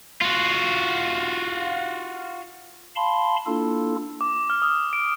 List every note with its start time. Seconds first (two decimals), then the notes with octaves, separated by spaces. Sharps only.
0.21 F4 F#4
2.95 F5 A5 B5 C6
3.46 A#3 D4 E4 F4 A4
4.21 D6
4.50 F6
4.62 D#6
4.93 D7